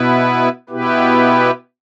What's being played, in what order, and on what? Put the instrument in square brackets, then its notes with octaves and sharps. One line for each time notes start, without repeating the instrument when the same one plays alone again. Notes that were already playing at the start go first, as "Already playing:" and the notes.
Already playing: [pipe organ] B2 B3 E4 B4
B2 B3 E4 G4 B4